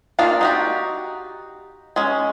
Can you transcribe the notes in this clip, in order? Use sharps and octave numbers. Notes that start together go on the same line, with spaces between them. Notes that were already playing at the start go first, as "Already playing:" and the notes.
A#3 D4 D#4 F4
D#4 F#4 G4
G#3 C#4